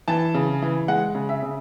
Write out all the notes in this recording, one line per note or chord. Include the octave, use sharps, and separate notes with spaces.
E3 A5
C#3
E3
G#3 F#5
C#3
E5
C#3